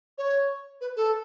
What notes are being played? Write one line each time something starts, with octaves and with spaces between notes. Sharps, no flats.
C#5
B4
A4